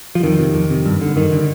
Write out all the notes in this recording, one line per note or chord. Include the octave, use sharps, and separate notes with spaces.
F3
F2 D#3
C3
F2
C3
G2
D3
G2 D#3
D3